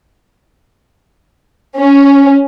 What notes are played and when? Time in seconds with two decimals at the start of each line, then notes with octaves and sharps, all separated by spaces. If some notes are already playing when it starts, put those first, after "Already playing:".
1.78 C#4